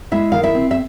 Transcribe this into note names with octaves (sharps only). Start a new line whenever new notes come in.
G#3 E4 E5
D#3 F5
E4 E5
C4
E5